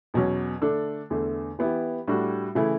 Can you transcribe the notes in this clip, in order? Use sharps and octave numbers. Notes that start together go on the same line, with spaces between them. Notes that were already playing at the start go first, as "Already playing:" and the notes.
E2 B2 F#3 C#4
D3 A3 D4 A4
E2 D3 A3
E3 B3 E4 G4
A2 G3 D4 F#4
C#3 E3 A3 E4